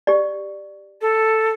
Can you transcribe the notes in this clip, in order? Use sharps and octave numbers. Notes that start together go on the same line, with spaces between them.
G4 D5
A4